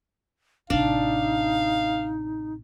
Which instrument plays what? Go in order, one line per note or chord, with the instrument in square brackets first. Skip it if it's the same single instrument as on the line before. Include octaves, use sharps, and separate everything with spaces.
[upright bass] A1 C3 [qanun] D4 [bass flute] D#4 [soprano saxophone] F5